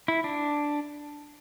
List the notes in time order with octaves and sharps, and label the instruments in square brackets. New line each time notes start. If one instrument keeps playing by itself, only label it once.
[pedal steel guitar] E4
D4